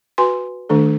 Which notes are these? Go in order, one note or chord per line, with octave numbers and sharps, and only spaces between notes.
F#4 B4 G#5 C6
D#3 A3 D4 A4